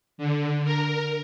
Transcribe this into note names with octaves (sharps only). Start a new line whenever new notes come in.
D3
A#4